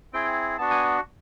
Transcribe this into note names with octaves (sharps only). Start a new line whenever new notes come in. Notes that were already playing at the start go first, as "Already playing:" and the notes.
C4 E4 G#4 G5
B3 D4 F#4 A5
G#5